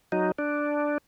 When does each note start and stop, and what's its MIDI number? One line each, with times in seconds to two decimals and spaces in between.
0.12 0.32 54
0.12 0.32 63
0.38 0.98 62